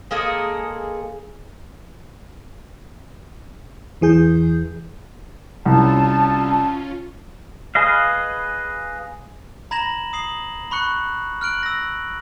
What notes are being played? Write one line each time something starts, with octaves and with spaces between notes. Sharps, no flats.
G#3 A#3 G#4 A4
E2 E3 G#4 G6
C2 C#4 F4 A5
G#4 B4 D#5 F5
A#5 B5 G#6 A#6 E7 F#7
D#6 C7 F#7
B5 C#6 F#6 C#7
F6 F#6 D7 F#7
E6 A#6